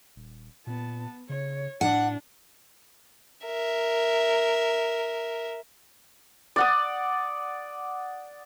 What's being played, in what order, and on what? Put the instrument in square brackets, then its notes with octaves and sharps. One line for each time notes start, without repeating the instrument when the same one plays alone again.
[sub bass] D#1
[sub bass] A#2 [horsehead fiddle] B3 A5
[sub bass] C#3 [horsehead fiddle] C#5
[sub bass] A2 [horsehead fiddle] D4 [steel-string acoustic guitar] F#5
[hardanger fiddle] A#4 E5
[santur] D5 F#5 D#6